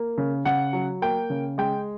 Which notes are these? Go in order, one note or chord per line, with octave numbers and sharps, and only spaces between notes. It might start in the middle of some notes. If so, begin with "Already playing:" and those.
Already playing: A#3
C#3
C#3 F#5
F#3
A#3 G5
C#3
G#3 G5